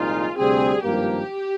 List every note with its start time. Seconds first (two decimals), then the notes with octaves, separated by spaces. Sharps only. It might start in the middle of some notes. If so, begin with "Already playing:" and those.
Already playing: C2 A#2 F3 G#3 D#4 F4
0.36 D2 C3 G3 C4 G#4
0.82 G#1 G2 F3 A#3 G4